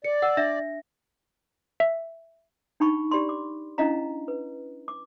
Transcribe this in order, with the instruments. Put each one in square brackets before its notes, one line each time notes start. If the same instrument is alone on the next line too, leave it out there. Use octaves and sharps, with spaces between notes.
[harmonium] D5 [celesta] C#7
[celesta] F#5 E6
D4 E5 A#6
[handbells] E5
[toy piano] D4 D#4 G5 B5 C#6
G4 D5 B5 C6
D6
C#4 D4 E4 D#5 F5 A#5
B4
D6